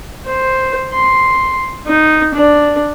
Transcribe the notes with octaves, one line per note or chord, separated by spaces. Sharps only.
C5
C6
D#4
D4